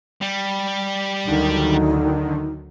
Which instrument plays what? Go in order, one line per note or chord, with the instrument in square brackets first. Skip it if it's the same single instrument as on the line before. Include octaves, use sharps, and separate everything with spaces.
[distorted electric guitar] G3
[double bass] D2 F#3 [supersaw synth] D3 D#3 [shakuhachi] D#4